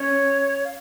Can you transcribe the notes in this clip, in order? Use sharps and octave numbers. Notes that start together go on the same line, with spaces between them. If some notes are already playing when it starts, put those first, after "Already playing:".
Already playing: C#4 C#5
F5